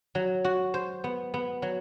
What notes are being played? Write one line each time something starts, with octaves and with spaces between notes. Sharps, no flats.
F#3
F#4
C5
B3
B3
F#3